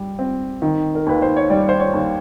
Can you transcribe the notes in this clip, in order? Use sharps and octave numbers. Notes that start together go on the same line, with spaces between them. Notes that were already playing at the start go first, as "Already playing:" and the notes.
Already playing: G3
C4
D#3
A#4
D#2 B4
C5
C#5
G3 D5
C5
C#5
D#2